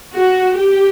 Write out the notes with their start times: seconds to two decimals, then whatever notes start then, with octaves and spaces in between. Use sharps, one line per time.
0.13 F#4
0.55 G4